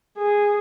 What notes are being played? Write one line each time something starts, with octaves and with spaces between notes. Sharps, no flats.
G#4